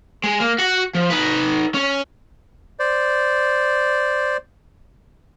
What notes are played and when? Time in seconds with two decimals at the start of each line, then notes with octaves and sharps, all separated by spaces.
0.24 G#3
0.40 A#3
0.58 F#4 F#5
0.95 F3
1.10 D#4 B4
1.74 C#4
2.79 C5 D5